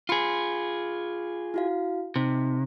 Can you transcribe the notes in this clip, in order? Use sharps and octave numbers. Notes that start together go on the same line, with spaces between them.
F4 G#4 B5 C6 C#7
E4 F#4 F5
C3 D#4